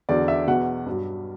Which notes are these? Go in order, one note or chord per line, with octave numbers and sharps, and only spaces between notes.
E2 D3 F#3 D5
E5
E2 B2 F#3 F#5
G2 F#3